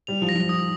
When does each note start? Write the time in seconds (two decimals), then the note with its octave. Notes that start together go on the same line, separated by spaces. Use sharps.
0.07 G3 F7
0.22 F3
0.29 A#6
0.36 F3
0.49 D#6